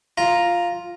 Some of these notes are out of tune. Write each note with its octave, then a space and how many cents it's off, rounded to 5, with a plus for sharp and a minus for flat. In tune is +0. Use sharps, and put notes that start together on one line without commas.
F4 +0 A#5 +5